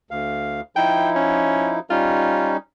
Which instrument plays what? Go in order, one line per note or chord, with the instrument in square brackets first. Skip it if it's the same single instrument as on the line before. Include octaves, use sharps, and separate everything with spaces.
[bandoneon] D2 F5
[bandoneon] F3 D#4 E4 [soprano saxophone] G5
[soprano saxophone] C#4
[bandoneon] G3 C#4 D#4 [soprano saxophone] F4